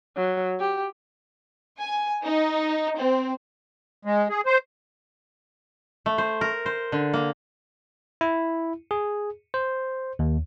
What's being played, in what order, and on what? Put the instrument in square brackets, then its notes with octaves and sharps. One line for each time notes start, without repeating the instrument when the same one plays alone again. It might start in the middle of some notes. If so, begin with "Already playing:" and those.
[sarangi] F#3
G4
[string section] G#5
D#4
C4
[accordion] G#3
G#4
C5
[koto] A3
C5
A#4
C5
D3
A#3
[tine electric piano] E4
G#4
C5
D#2